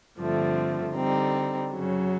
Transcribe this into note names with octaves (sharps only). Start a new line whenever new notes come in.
G2 D3 F3 A3 C4
D3 G3 C4 D#4
F#2 C#3 F#3